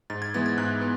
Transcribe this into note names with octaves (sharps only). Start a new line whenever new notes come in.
G#2 A6
G#6
E3 G#3 B3 A6
G#6
G#2 F#6
B3